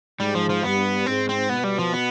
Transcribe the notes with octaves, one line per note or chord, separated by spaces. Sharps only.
G#2 G3
F3
F3
G2 B3
G#2 C4
C4
B2 B3
G3
F3
B3